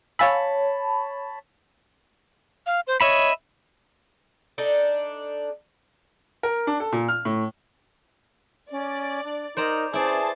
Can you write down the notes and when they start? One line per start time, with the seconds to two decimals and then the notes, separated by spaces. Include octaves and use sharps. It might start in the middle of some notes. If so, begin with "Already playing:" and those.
0.19 C#5 F5 G#5 A5 B5 E6
2.66 F5
2.87 C5
3.01 C#5 D#5 E5 B5
4.58 D4 D#4 A4
6.43 A#4
6.67 D4
6.80 A4
6.92 A#2
7.08 F6
7.25 A2
8.71 C#4 D5
9.24 D4
9.57 D#4 A#4 C5 D5 A#5
9.93 C#4 E4 G#4 B4 C5 D5 A5